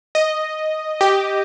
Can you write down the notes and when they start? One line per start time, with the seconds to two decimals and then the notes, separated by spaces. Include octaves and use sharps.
0.15 D#5
1.01 G4